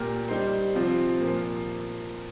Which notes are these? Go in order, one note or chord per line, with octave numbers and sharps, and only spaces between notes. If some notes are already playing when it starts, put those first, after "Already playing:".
Already playing: A#2 A#3 G4 A#4
G3 D#4 C5
C3 F3 C4 F4
A#2 F3 A#3